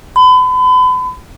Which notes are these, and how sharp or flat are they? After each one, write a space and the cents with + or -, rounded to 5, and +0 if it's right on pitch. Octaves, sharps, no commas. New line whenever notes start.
B5 +40